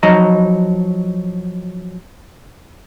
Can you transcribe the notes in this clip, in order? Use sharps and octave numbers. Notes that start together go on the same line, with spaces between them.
F3 F#3 D#4 D#5 A#5